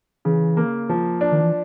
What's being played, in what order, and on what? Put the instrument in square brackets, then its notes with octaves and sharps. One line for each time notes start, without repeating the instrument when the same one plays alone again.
[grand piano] C#3 [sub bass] E3
[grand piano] A#3
F3
D4
[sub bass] D#3
E3